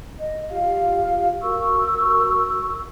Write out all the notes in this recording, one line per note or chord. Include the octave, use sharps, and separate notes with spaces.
D#5
F4 G4 F5
F#4 A#4 C#6 E6